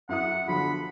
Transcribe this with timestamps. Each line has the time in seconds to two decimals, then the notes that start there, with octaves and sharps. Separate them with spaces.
0.09 F#2 E4 F#5 D#6
0.48 D3 F3 F#3 B5